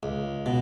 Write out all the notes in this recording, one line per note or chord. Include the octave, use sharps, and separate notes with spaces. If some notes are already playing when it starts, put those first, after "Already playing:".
C#2
B2